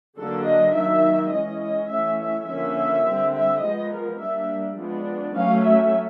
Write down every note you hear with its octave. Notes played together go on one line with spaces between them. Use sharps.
D3 F#3 A#3 D4 A4
D#5
D#3 F#3 A#3 E5
E3 G#3 C#4 D#5
D#5
E3 A3 C#4 E5
E5
D3 F3 A#3 C#4 E5
D3 G3 C4
E5
F3 G#3 B3 D#5
A#4
G3 A#3 D4 E5
F3 G#3 B3 D4
F#3 A3 C#4 F5
E5